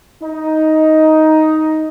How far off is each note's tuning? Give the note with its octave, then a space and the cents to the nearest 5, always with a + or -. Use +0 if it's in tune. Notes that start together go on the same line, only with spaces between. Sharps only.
D#4 +10